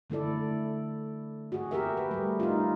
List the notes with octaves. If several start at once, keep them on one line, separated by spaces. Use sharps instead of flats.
D3 A3 E4 A4 D5
F#4 G#4
G4 G#4 A#4 E5
B4
G3 A3
D#4 F4